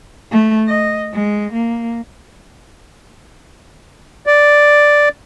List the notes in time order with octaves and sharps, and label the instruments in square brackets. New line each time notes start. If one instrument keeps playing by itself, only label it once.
[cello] A3
D#5
G#3
A#3
[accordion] D5